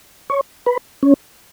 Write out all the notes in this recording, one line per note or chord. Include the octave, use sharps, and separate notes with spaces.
C#5
B4
C#4